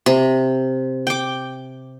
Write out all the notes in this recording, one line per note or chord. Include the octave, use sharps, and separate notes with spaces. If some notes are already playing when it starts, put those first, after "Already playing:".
C3
G5 D6